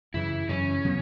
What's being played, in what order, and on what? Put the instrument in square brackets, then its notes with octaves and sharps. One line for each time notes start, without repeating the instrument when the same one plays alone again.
[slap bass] F#2 C#3 E3 [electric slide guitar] E4
[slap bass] F#2 C#3 E3 [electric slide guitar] C#4
[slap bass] C#3 F#3 B3